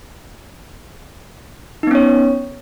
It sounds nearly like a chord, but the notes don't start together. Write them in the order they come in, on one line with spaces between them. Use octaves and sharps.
D#4 B3 C#4 C#5